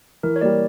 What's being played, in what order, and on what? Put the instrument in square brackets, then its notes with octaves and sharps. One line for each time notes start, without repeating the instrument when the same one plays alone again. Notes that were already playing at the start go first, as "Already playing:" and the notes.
[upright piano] E3 [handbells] A#4
[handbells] C#5
[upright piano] G3 A#3 [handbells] D5